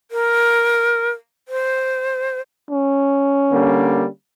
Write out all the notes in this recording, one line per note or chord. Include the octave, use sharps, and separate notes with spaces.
A#4
C5
C#4
D3 G3 A#3